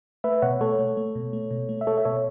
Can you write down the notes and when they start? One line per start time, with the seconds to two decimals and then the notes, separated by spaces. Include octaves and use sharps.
0.24 A3 B4 E5
0.42 B2 C#5 F#5
0.61 A3 A4 C#5
0.79 A3
0.97 A3
1.15 B2
1.33 A3
1.51 B2
1.69 A3
1.81 E5
1.87 A3 A4 C#5
1.98 E5
2.05 B2 A4 C#5